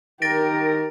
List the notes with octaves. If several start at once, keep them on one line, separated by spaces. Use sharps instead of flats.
D#3 G4 A#4 A6 A#6 D7